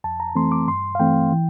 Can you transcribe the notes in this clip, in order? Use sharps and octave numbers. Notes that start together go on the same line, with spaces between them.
F2 A5
A#5
E3 A3 C4 C6
D6
G2 C6
F5
E3 A3 C4 G5
E3